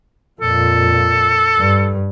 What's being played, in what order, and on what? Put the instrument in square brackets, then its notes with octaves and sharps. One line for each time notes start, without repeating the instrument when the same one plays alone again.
[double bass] F2 A#2 [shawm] A4
[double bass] G2